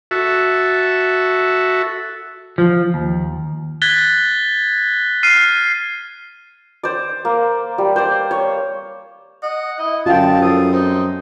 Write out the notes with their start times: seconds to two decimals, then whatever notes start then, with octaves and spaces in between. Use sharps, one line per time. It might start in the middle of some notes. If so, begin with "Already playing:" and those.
0.11 F#4 A4 E5
2.58 F3
2.94 D#2
3.82 F#6 G#6 A6 B6 G7
5.23 F6 C7 D#7
6.83 C5 D5
7.25 A#3
7.78 G3
7.96 C5 D5
8.31 C#5
9.43 D#5 F#5
9.79 E4 D#5
10.06 F#2 D3 F4 G5 A5
10.42 F3 A4 D#6
10.73 C4 D#4